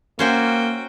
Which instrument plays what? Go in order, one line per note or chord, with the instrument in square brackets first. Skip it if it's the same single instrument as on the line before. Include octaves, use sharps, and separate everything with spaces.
[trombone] A#3 [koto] C#4 C5 E5 [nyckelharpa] F#4 G5